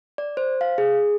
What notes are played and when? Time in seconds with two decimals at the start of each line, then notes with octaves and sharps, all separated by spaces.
0.18 D5
0.37 C5
0.61 F5
0.78 G#4